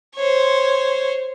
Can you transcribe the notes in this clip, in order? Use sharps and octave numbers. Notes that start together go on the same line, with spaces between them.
C5 C#5